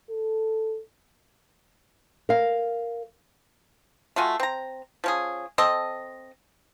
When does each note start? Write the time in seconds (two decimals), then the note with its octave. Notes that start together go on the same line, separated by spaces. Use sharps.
0.10 A4
2.29 A#4 F5
4.16 A3 F4 F#4 G#5
4.40 C4 A#5
5.04 F3 C#4 G#4
5.58 C4 A4 D#5